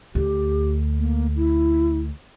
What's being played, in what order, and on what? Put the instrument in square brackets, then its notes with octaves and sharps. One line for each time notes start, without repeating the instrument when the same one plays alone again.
[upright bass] D2 [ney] G4
[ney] A#3
E4